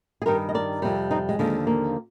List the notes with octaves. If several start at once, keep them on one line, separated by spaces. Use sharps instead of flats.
G#4
G2 D#3 G3 G4 A#4
D#5
A#4 D5
F2 C3 G3
C4 D#4
G#3
D#2 D3 F3
A#3